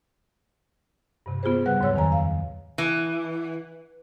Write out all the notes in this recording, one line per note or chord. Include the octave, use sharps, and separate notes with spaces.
G2 C3
B3 F4 G4 G#4 C5
C#3 G3 B4 F#5 F#6
D#2 G#2 F#3 C#5 E6
F2 D#3 G#5 A#5
F5
E3